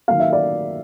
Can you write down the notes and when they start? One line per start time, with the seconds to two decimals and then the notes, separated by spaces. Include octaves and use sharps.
0.08 D#3 F#3 A#3 F5
0.20 E5
0.33 D5